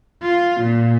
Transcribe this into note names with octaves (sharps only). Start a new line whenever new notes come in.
F4
A#2